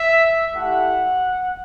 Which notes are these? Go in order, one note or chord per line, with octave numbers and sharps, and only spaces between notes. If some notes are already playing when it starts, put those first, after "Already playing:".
Already playing: E5
A3 E4 G4 F#5